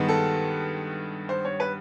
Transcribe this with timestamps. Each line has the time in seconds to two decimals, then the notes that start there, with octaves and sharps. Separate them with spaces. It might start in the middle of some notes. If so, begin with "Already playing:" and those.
Already playing: G2 D#3 G#3 B3
0.08 A4
1.29 C5
1.45 C#5
1.60 B4